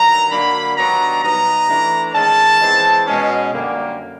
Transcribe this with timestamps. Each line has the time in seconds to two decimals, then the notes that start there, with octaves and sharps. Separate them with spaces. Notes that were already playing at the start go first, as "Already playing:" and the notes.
Already playing: G2 D#3 F#3 A#5
0.31 D3 F#3 A#3 D4 B5
0.78 G2 D#3 F#3 B3 D4 A#5
1.23 B2 G3 B3 D#4 A#5
1.69 E3 A3 D4
2.15 D#3 G#3 C#4 A5
2.61 E3 G#3 C4
3.07 B2 G#3 C#4
3.52 F#2 D3 G3 A#3